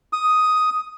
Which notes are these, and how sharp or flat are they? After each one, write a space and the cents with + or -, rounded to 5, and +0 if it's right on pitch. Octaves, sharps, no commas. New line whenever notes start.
D#6 +5